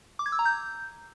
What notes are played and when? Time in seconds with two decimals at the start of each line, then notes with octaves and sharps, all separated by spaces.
0.19 D6
0.26 G#6
0.32 E6
0.39 A#5
0.45 G6